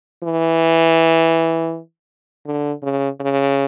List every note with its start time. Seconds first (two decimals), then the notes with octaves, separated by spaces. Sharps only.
0.24 E3
2.46 D3
2.83 C#3
3.20 C#3